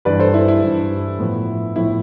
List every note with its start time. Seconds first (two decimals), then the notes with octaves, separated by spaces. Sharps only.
0.05 G2 E3 G3 B4 D5
0.20 A4 C5
0.34 E4
0.48 E4
0.62 G2 E3 G3
1.19 A2 F3 B3
1.76 A2 F3 B3 E4